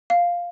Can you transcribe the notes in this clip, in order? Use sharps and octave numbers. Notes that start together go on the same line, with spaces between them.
F5